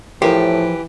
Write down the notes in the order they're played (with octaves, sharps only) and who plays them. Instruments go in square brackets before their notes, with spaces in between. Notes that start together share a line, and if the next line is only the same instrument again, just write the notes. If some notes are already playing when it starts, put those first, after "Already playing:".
[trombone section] A2 [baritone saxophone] E3 [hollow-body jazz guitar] F3 A#4 C5 [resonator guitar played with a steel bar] G4